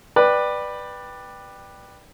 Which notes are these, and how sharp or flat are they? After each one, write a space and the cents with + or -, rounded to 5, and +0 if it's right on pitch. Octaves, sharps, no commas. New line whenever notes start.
B4 -5 D5 +15 G5 +0